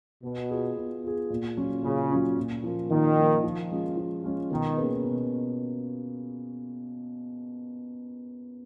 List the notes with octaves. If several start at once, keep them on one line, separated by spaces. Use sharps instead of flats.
B2 B3
F4 G#4
B3
F4 G#4
A#2
F#3 C#4 F4
A#2 C#3
F#3 C#4 F4
A#2
F3 A#3 F4
A#2 D#3
F3 A#3 F4
F3
G#3 C#4 F4
F3
G#3 C#4 F4
B2 D#3
A#3 C#4 G#4 B4
B2